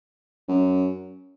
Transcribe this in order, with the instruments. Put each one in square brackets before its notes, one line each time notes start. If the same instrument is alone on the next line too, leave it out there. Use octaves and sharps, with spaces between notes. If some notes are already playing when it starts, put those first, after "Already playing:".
[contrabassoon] F#2